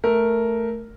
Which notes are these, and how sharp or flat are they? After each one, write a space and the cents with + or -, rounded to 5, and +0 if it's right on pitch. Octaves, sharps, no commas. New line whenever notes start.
A3 +0 A#4 +0